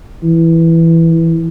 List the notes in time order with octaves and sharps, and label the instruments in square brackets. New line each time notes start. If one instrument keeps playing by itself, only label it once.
[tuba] E3